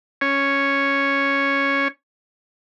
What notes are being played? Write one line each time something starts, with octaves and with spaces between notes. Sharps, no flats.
C#4 C#5